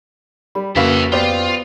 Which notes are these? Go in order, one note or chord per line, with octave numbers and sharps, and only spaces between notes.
G3 B5
F2 C#3 A#3 F#4 B4 C#5 E5 F5
B3 F4 G4 C5 D5